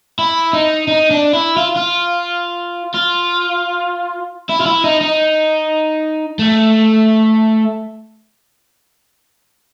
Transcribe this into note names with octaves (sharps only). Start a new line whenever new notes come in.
E4
D#4
D#4
D4
E4
F4
F4
F4
E4
F4
E4
D#4
D#4
A3